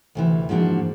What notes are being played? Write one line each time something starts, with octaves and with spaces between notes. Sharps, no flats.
D2 C3 E3
G#2 F3 A#3 D4 F#4